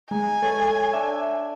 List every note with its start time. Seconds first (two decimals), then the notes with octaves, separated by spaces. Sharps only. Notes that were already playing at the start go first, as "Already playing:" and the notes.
0.11 G#3 D#4 D#5 G#5
0.43 A4 C#5 E5
0.93 D4 E5